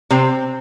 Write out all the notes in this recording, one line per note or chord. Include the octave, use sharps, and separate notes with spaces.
C3 C4